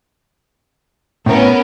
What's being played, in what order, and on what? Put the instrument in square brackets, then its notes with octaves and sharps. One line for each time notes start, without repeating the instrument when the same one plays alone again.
[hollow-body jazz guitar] A2 [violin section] B3 C#4 A#4